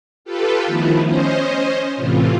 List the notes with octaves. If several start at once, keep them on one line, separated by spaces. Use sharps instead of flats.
F4 G4 A4 B4
D#3 F3 A3 B3 E4
C#4 C5 D#5
A2 C3 E3 F4